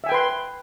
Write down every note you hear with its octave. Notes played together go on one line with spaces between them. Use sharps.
B4 E5 G5 G#5 C6